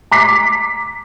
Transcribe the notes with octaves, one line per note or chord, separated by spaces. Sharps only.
A#5 D6 B6 C7